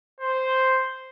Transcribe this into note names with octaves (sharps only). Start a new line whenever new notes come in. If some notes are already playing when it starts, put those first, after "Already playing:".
C5